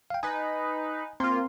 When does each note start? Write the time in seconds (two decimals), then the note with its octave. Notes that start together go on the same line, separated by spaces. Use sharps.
0.10 F5 G5
0.23 D#4 B4 G#5
1.20 A#3 C4 F4 C6